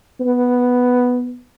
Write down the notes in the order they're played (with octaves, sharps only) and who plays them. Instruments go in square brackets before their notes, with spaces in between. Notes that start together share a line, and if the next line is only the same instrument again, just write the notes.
[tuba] B3